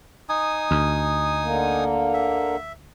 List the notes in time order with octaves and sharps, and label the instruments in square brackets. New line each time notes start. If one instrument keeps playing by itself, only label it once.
[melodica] D#4 G#5 D#6
[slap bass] D2
[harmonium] D3 A#3
[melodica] E5